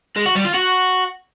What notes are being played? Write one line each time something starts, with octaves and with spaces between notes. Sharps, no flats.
G#3
F#4
G3
F4
F#4